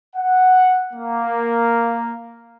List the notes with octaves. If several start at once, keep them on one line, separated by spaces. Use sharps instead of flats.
F#5
A#3